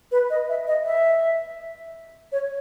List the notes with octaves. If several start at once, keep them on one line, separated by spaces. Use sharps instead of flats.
B4
D#5
E5
D#5
E5
C#5